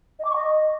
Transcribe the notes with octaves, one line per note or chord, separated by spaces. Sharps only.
D#5
D6
C#6
D#5